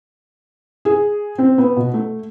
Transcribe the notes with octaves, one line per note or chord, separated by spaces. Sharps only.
G#4
C4
B3
B2
A3